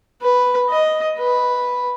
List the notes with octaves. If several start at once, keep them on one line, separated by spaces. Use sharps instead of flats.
B4
D#5
B4